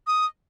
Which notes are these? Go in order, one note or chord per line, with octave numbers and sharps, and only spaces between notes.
D#6